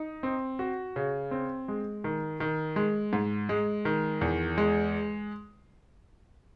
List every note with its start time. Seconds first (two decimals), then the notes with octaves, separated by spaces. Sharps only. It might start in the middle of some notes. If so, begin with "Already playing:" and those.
Already playing: D#4
0.23 C4
0.59 F#4
0.96 C#3
1.31 C4
1.68 G#3
2.04 D#3
2.40 D#3
2.76 G#3
3.13 G#2
3.49 G#3
3.85 D#3
4.21 E2
4.58 G#3